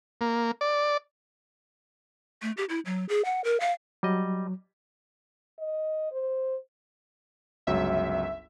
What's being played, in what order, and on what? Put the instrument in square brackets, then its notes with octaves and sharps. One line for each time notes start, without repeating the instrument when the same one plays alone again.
[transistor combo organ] A#3
D5
[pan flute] A3
G4
E4
F#3
G#4
F#5
A#4
F5
[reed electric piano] F#3 [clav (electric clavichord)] G3 D#5
[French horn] D#5
C5
[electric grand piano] G1 C#2 F#3 [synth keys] E5